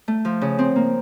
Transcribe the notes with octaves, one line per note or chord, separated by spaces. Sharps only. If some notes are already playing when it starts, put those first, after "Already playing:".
A3
F3
C#3
C4
A#3